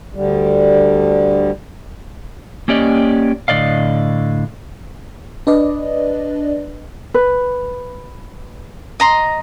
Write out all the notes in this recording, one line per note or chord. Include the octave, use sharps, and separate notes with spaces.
D2 D3 G3
A#3 C#4 G4 D5 D#5
A2 D3 D5 D#5 F5
D4 B4 D5 D#5
B4
D#5 A#5 C6